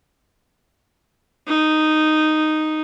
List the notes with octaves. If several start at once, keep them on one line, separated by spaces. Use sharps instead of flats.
D#4